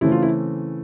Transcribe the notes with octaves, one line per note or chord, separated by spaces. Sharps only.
C#3 E3 A3 C4 E4
F4
E4